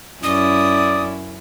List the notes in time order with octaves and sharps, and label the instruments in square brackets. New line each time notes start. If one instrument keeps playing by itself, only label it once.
[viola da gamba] F#2 C#4 E4 [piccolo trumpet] D5 [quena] D#6